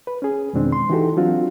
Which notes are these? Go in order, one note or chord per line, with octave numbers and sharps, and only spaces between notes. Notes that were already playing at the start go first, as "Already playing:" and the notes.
B4
C#4 G#4
F2 B2 D#3 G#3 C4 D4
C6
E3 D#4 F#4 G4 A4
F#3 C4 D4 F4 F#4